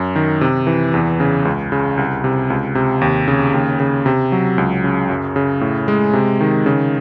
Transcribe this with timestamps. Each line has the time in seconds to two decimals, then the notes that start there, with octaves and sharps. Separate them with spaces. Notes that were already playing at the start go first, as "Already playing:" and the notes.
Already playing: F#2
0.16 D#3
0.41 C3
0.67 E3
0.94 E2
1.20 C#3
1.45 C#2
1.72 C#3
1.97 C2
2.24 C3
2.50 C#2
2.75 C3
3.01 D#2
3.28 C#3
3.54 D#2
3.80 C#3
4.06 C3
4.32 F#3
4.58 C#2
4.84 C#3
5.10 F#2
5.36 C#3
5.61 A2
5.88 G#3
6.13 C3
6.41 D#3
6.66 C#3